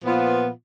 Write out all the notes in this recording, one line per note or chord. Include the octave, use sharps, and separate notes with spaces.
A#2 F3 B3 F4